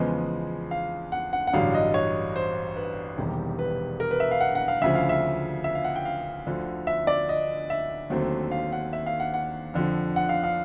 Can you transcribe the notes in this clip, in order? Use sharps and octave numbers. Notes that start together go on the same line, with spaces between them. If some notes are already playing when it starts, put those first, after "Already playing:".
Already playing: E2 C#3 F3 G#3 B3 D#5
F5
F#5
F#5
F#5
A1 G2 D3 F#3 F5
D#5
C#5
C5
B4
E1 E2 C3 D#3 G3
B4
A#4
B4
E5
F5
F#5
F#5
F5
D2 C#3 F3 E5
F5
E5
E5
F5
F#5
G5
F5
D2 D3 F3
E5
D5
D#5
E5
D#2 D3 F#3 A3 C4
F5
F#5
E5
F5
F#5
F#5
F2 D3 F3
F#5
F5
F5